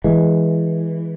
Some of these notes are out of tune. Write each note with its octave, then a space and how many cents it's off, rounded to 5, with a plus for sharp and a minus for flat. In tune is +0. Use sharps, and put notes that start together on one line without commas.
E3 +0 G#3 +0